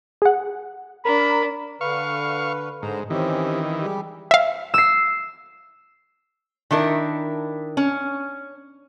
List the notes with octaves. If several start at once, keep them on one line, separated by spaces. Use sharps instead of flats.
G#4 F#5
D4 A#4 B5
D3 B4 F5 C#6
G#2 D3 C5 A#5
D#3 E3 C4 C#4 G4
G3 G#3 G4
E5 F5
E6 C7
D#3 D4 E4 A#4
C#4